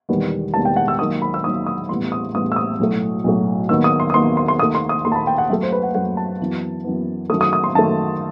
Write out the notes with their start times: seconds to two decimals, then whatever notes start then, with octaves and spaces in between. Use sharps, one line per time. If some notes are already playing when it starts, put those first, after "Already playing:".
0.09 E1 E2 D#3 G3 B3
0.54 E1 E2 D#3 G3 B3 A5
0.65 G5
0.76 F#5
0.88 E6
0.99 D#2 D#3 F#3 D#6
1.22 B5
1.34 E6
1.44 D#2 D#3 F#3 D#6
1.67 D#6
1.89 A1 A2 G3 B3 C6
2.12 D#6
2.34 A1 A2 G3 B3 D#6
2.52 E6
2.56 D#6
2.79 B1 A2 F#3 A3
3.24 B1 A2 F#3 A3
3.69 D#2 D#3 F#3 B3 E6
3.84 D#6
4.00 C6
4.10 D#6
4.14 D#2 D#3 F#3 B3 C6
4.37 C6
4.48 C6
4.59 D#2 D#3 A3 D#6
4.75 C6
4.89 D#6
5.04 D#2 D#3 A3 C6
5.12 A5
5.15 B5
5.27 G5
5.38 F#5
5.49 F#2 F#3 A3 E5
5.63 C5
5.72 B4
5.83 F#5
5.95 F#2 F#3 A3 F#5
6.17 A5
6.40 F#2 E3 B3
6.84 F#2 E3 B3
7.30 F#2 D#3 A3 D#6
7.41 D#6
7.53 D#6
7.64 C6
7.75 F#2 D#3 A3 A5